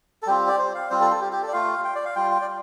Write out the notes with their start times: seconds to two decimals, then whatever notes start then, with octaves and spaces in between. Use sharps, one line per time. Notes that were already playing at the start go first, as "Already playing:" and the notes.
0.23 A4
0.27 G3 C4 F4 G4
0.48 D5
0.59 C5
0.75 F5
0.90 G3 C4 F4 C5
1.01 A4
1.11 A4
1.21 G4
1.33 G4
1.43 A4
1.48 D5
1.53 A3 F4 F5
1.84 G5
1.95 D5
2.05 F5
2.16 G3 F4 G5
2.31 G5
2.42 D5